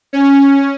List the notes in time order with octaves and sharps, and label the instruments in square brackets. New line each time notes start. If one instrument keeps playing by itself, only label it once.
[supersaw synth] C#4